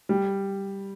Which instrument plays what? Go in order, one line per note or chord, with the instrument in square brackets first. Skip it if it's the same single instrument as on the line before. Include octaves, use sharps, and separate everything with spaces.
[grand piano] G3